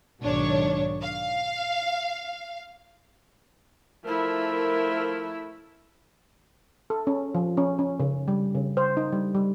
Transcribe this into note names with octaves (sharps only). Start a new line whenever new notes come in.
B1 G#2 D#3 D4 C#5
F5
F3 A3 E4 A#4
A4
C#4
F3
C#4
C#4
C#3
G3
C#3
C5
D#4
G3
G3